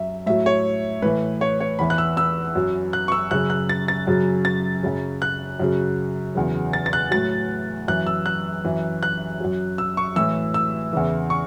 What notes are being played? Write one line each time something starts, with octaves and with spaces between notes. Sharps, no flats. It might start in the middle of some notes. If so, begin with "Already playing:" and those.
Already playing: F#2 E5
A2 F#3 E5
C#5
A2 E3 B4
C#5
C#5
E2 E3 B5
F#6
E6
E6
F#2 F#3
F#6
C#6
E6
F#2 C#3 F#3 F#6
F#6
A6
A6
F#2 C#3 F#3
A6
F#2 C#3 F#3
F#6
F#2 C#3 F#3
E2 C#3 F#3
A6
A6
F#6
A2 F#3 A6
F#2 E3 F#6
E6
F#6
F#2 E3
F#6
F#2 F#3
E6
C#6
A2 E3 E6
E6
E2 C#3 E3
C#6